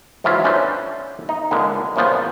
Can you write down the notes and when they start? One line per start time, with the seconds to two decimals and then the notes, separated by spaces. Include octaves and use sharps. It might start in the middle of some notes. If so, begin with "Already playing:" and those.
0.24 G#2 E3 F#3 F4 E5
0.44 C#4 D4 A4 B4 C5 E5
1.29 D#4
1.51 C#2 D3 G#3 A#3 B4
1.96 A#2 C#3 F3 B3